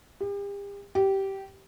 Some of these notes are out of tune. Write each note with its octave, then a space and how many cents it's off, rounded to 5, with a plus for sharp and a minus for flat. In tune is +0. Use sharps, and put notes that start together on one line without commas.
G4 +40
G4 -15